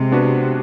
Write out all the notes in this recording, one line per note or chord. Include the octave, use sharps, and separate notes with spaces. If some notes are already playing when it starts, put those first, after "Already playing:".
Already playing: C3 G#3
B3 D4 F#4 B4